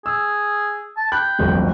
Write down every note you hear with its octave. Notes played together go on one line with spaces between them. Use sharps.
G#4 E6
A5
G5 B5 F#6
D1 G1 F2